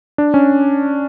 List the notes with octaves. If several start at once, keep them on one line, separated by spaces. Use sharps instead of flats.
D4
C#4